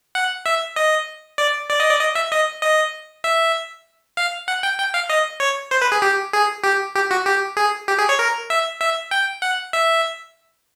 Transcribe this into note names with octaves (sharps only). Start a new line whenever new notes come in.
F#5
E5
D#5
D5
D5
D#5
D5
D#5
E5
D#5
D#5
E5
F5
F#5
G5
G5
F5
D#5
C#5
C5
B4
G#4
G4
G#4
G4
G4
F#4
G4
G#4
G4
G#4
C#5
A#4
E5
E5
G5
F#5
E5